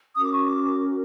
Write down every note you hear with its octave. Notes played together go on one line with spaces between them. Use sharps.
C#4 F#4 A#4 D#6
D6
C#6
D6